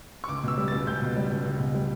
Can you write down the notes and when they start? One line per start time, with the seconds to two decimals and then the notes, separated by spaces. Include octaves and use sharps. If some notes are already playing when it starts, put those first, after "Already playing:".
0.24 C#6
0.28 C#2 D6
0.43 B2 E6
0.58 G3
0.68 C#2 A6
0.87 C#2 G6
1.02 B2
1.16 G3
1.31 C#2
1.46 C#2
1.60 B2
1.75 G3